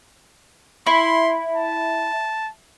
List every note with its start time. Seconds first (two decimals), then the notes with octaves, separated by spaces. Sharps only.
0.86 E4 C6
1.55 A5